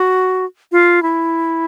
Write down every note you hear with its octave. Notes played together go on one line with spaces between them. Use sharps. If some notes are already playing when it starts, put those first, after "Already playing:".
Already playing: F#4
F4
E4